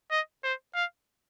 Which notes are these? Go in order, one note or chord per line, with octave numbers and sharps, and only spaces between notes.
D#5
C5
F5